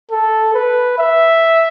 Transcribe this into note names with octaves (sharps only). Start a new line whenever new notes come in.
A4
B4
E5